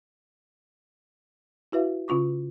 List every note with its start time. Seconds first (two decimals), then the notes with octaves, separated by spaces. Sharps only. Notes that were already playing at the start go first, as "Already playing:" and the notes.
1.72 E4 F#4 B4 E5 F5
2.08 C#3 C#4 F4 C#6 D6